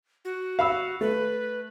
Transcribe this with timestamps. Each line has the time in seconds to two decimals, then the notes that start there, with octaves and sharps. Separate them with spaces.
0.25 F#4
0.59 F5 B5 E6
1.01 A3 B4